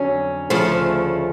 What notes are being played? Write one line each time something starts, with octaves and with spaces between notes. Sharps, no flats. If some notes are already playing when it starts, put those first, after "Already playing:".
Already playing: F2 D3 F#3 C#4
D2 C#3 F3 A3